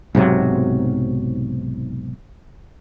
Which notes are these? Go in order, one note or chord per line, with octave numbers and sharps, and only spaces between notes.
B1 G#2 C3 F#3